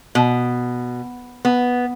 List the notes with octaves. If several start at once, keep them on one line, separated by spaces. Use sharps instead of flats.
B2
B3